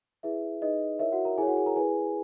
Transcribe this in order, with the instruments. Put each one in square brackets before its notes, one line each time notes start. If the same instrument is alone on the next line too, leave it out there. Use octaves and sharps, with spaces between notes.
[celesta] E4 G#4 B4 E5
D#4 G#4 B4 D#5
E4 A#4 C#5 E5
F#4 F#5
A#4 A#5
E4 G#4 A#4 C#5 G#5
F#4 F#5
G#4 G#5
A#4 A#5
E4 G#4 B4 G#5